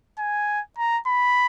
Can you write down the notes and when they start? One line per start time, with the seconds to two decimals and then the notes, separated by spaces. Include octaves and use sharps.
0.19 G#5
0.78 A#5
1.07 B5